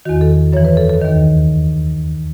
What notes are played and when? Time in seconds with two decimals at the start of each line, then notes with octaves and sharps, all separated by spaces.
0.05 E2 D#3 F#4
0.21 A4
0.53 F#2 E3 C#5
0.65 B4
0.77 A4
0.90 A4
1.01 D#2 D#3